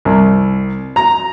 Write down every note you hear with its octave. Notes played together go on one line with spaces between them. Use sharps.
C2
A#5